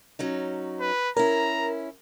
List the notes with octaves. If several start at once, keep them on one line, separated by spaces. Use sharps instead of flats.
F#3 C#4 D#4
B4
C#4 E4 A#4 A#5